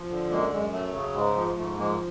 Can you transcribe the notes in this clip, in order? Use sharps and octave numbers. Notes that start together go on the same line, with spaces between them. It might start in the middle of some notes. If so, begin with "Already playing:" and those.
Already playing: F3
D3
F#2 G#3 A#3
F#2 G#3
F#3 A3
C#3
G#2 G#3
F3
G#2 A3
F3 G#3 A#3